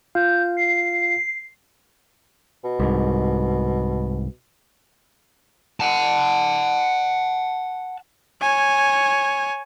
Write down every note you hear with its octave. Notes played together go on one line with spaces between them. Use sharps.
F4 F5 G6
C7
B2
C2 G#2
F#5 A5
C#5 G#5